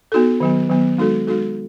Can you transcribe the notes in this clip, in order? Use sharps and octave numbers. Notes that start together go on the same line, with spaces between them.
B3 D#4 F#4 A4
D#3 F#3 B3
D#3 F#3 B3
G#3 D#4 F#4 A4
G#3 D#4 F#4 A4